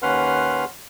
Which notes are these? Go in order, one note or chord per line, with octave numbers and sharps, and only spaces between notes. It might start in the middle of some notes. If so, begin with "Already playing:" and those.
D#2 C#4 B4 F#5 C6 F6